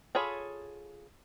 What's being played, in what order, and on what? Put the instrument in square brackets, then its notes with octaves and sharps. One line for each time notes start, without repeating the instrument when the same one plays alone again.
[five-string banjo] F4 G#4 A4 C#5 B5